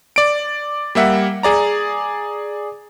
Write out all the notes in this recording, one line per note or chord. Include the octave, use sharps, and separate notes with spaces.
D5 D7
G3 A#3 E5 F#5
G#4 D5 A#5